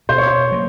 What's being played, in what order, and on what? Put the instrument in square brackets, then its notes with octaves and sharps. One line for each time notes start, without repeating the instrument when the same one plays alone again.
[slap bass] B2 [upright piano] C5
[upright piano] C#5
C5
[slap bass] F#3 A#3